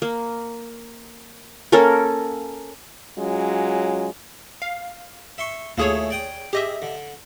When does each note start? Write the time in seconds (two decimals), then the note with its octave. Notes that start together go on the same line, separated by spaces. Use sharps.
0.02 A#3
1.72 A#3 C#4 A4 A#4
3.18 F#3 G#3 C#4 F4
4.62 F5
5.38 E5 C6 C#6
5.78 D#2 A3 E4 F4 G#4 C#5
6.10 D5 G5 D#6
6.53 G4 G#4 D#5 E5
6.82 D3